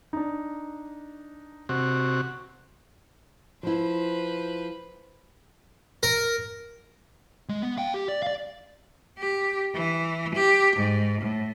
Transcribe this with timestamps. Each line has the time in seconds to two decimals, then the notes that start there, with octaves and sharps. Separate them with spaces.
0.13 D4 D#4
1.69 C3 F#4
3.63 F3 E4 B4 C5
6.03 A#4
7.49 G#3
7.63 B3
7.78 F5 G5
7.94 G4
8.09 D5
8.23 D5 F5
9.19 G4
9.74 E3
10.36 G4
10.77 G#2
11.22 A2